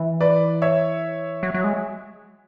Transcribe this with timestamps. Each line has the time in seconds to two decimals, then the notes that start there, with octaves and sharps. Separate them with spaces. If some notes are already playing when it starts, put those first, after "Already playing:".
Already playing: E3
0.21 B4 D5
0.62 C#5 E5
1.43 F#3
1.54 F#3
1.64 G#3